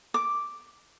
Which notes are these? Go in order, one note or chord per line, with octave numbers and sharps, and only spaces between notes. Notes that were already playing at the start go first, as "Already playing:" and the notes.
D6